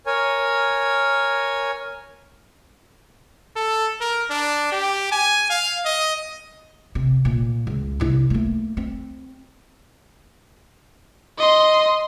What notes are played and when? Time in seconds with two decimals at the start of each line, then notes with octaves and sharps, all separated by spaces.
0.06 A#4 C#5 G#5
3.56 A4
4.01 A#4
4.30 D4
4.72 G4
5.12 G#5
5.50 F5
5.85 D#5
6.95 C3
7.25 A#2
7.67 C#2
8.00 C2 E4
8.30 A3 A#3
8.77 C4
11.38 D#5 C6